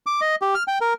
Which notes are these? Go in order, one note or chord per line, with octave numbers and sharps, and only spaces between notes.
D6
D#5
G4
F6
G5
A#4